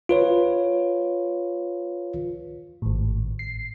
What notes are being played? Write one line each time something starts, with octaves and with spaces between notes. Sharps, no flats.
F4 B4 C#5
G#1 A2
C7